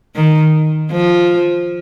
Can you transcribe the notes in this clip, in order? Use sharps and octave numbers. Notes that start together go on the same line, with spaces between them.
D#3
F3